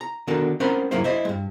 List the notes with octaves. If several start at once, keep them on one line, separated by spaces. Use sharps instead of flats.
A#5
D3 D#3 B3 F#4 A4 A#4
C4 C#4 A#4 C5 F#5 B5
C#2 G2 F#3 A#3 E4 C5
E4 C5 D#5
G2 G#3